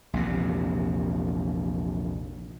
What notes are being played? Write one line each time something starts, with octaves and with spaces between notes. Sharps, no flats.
A#1 E2 C3